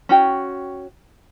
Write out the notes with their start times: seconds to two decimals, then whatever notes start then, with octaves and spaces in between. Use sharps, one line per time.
0.09 C#4 F#4 G5